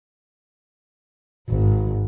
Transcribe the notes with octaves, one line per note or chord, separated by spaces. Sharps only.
G#1